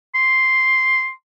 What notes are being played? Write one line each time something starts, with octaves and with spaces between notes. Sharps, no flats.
C6